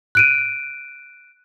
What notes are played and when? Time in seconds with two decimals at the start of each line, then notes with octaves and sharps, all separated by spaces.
0.15 F#6 D7 D#7